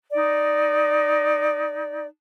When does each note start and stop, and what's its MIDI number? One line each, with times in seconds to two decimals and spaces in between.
0.12 2.06 63
0.12 2.06 74
0.12 2.06 75